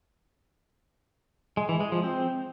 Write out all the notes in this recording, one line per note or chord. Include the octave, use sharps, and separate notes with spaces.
G#3
E3
G#3
F3
C4